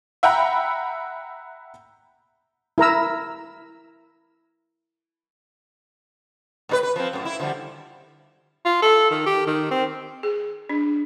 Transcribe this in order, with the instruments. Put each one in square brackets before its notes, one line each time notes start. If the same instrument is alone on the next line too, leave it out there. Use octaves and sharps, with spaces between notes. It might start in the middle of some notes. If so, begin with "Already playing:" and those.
[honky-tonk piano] E5 F#5 G5 A#5 B5
[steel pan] E4 A#4 A#5 E6
[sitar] A2 D#4 B4
B4
F3 C4
F#2 A2
E4
D3 F3 G3
[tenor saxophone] F4
A4
D#3
G4
D#3
C4
[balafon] G#4
D4